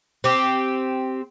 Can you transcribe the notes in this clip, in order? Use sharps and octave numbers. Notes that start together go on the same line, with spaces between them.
C4 G4